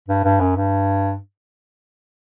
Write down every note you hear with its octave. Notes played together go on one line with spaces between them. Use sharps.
G2
G2
F#2
G2